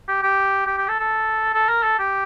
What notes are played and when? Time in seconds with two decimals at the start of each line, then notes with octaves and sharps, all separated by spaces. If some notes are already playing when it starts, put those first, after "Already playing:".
0.08 G4
0.23 G4
0.67 G4
0.77 G4
0.88 A4
0.99 A4
1.54 A4
1.69 A#4
1.83 A4
1.99 G4